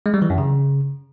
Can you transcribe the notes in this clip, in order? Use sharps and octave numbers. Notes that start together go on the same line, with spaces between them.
G#3
G3
E3
F#2
C#3